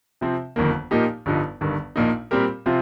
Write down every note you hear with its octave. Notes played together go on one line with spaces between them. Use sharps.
C3 F3 C4
G1 F2 D#3 A#3
A#2 F3 A#3 D#4 G4
G1 G2 F3 D#4
G1 G2 D#3
A#1 A#2 A#3 D#4
A#2 G3 C4 G4 A#4
C3 F3 C4 F4